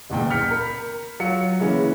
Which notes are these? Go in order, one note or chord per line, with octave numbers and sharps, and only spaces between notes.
F#1 E2 A#2 G5
F6 G6 B6 C#7
A#4 B5 B6
F#3 F4 C#7
C#3 E3 G#3 A#3 C#4